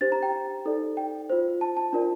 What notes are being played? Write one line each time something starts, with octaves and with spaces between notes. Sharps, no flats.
D4 G4 C5 A6
A#5
G5
D#4 A4 D5
G5
F4 C5
A5
A5
D4 F4 A#4 D5